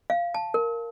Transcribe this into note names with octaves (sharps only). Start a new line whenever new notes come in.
F5
A5
A#4